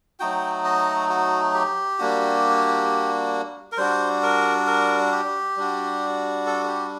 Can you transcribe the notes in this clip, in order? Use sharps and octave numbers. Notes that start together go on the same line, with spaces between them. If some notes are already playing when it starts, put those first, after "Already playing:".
F#3 A3 D#4 F#4 G5
D#5
F#4
G4
G3 A#3 D4 F#4
A#4
G3 D4 F#4 C5
A#4
A#4
G4
G3 D4 F#4
A4
G4